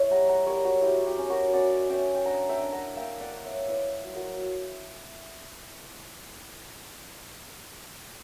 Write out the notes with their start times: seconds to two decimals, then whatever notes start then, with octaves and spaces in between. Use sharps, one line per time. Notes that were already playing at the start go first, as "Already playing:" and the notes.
Already playing: E4 C#5 E5
0.11 G3 F#5 A#5
0.29 F#5 A#5
0.46 G3 A#4 C#5
0.65 F#4
0.82 E4 G4
1.06 G4
1.18 C#4
1.30 F#4 A#4
1.53 C#4 D5 F#5
1.89 C#4 E5 G5
2.15 G5
2.25 D4 F#5 A#5
2.49 E5 G5
2.61 D4
2.72 F#5 A#5
2.96 A#3 E5 G5
3.20 D5 F#5
3.32 A#3
3.45 C#5 E5
3.68 E4 B4 D5
4.04 F#3
4.15 F#4 A#4